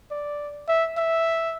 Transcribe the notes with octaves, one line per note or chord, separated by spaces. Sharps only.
D5
E5
E5